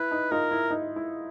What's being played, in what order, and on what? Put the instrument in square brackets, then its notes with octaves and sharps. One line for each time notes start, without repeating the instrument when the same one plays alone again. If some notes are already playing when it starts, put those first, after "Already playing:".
Already playing: [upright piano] E4 [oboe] B4
[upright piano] D#4
[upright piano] D#4 F4 [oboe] A#4
[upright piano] E4
D#4
E4